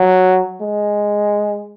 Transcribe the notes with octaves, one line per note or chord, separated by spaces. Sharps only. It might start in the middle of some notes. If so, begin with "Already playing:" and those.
Already playing: F#3
G#3